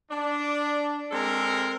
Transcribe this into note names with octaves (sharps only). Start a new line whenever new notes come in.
D4
G#3 C4 A4 A#4